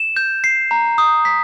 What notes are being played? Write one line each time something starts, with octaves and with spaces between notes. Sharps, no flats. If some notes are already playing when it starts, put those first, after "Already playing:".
Already playing: E7
G6
C7
A#5
D#6
B6